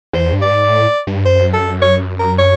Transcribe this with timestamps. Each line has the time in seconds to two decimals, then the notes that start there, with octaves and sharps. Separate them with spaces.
0.13 E2 C5
0.33 G2
0.41 D5
0.51 G#2
0.70 A2
1.07 G2
1.25 F#2 C5
1.53 A4
1.82 C#5
2.19 A#4
2.38 C#5